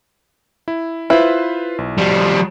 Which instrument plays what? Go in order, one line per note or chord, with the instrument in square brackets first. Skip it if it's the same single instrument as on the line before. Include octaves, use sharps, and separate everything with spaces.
[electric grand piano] E4
[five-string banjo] E4 [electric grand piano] F4 B4 C5
[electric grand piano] B1
[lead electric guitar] F3 G3